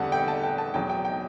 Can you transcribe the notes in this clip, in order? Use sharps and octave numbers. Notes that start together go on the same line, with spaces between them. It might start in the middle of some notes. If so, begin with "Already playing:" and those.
Already playing: E2 D3 G3 F#5 A5
G5
A5
G5
A5
E2 B2 F#3 G5
G5
G5